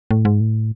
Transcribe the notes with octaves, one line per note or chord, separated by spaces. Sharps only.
A2
G#2
A2